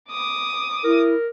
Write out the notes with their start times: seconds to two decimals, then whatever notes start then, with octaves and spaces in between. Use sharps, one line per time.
0.11 D6 D#6
0.84 E4 A#4